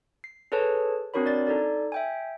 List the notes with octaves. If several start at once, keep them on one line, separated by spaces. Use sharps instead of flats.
C7
G#4 A4 B4 C#5 A5
C4 D4 F#4 A#4 C#5 B5
D5 A6
D#4 A4 D5
E5 G5 G#5